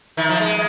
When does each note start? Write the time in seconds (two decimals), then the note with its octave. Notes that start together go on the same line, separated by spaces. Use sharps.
0.17 D#3
0.29 F3
0.40 G#3